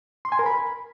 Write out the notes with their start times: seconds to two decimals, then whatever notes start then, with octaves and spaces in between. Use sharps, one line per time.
0.25 C6
0.32 G#5
0.39 A#4
0.46 B5